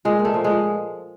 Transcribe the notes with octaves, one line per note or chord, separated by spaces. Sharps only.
A#2 G#3
A#2
A3
F3
G#3
F3